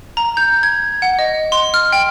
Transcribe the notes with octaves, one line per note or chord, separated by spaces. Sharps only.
A#5
G6
G#6
F#5
D#5
C6
F6
G5